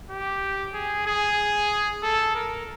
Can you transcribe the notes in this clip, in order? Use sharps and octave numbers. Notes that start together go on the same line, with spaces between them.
G4
G#4
G#4
A4
A#4